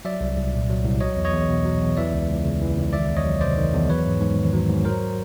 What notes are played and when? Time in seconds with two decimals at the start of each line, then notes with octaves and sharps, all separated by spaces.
0.05 F#3 D5 E5
0.21 C2
0.37 C2
0.53 A#2
0.70 F#3
0.85 C2
1.01 F#3 C#5 D#5
1.17 E2
1.25 C#5 D#5
1.33 E2
1.49 B2
1.65 F#3
1.81 E2
1.97 E3 D5 E5
2.13 C#2
2.29 C#2
2.45 C#3
2.61 E3
2.77 C#2
2.93 D#3 D5 E5
3.09 E2
3.17 C#5 D#5
3.25 F#3
3.41 C3 C5 D5
3.58 D#3
3.73 E2
3.89 F#3 B4 C#5
4.06 G#2
4.21 G#2
4.37 D#3
4.53 F#3
4.69 G#2
4.85 F#3 A#4 C5